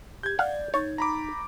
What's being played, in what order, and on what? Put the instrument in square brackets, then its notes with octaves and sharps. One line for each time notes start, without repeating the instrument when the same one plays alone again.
[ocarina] G4 [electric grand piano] G6 G#6
[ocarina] D5 [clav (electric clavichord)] F5 F#5
[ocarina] D#4 [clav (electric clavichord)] C#5 [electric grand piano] A6
[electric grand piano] A#5 B5 D6